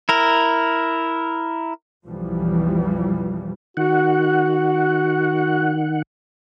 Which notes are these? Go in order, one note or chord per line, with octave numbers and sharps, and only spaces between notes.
E4 A#4
B1 F2 E3 F3 G3
D#3 F#4 F#5